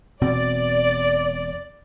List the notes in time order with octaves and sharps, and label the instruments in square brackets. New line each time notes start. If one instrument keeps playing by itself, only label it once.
[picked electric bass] E1 B2 C4 [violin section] D5